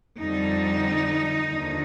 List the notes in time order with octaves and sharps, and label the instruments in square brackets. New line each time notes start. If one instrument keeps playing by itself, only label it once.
[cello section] F2 D3 G3 D#4
D#2 D3 F3